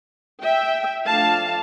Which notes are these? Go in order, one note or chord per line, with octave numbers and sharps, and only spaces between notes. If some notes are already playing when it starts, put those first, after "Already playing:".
E5 G5
F3 A3 D4 F5 A5